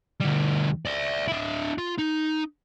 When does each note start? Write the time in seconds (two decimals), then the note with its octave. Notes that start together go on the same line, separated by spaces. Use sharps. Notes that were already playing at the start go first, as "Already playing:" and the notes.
0.21 D2 G3
0.85 D5 E5
1.28 D4 E4
1.78 F4
1.99 D#4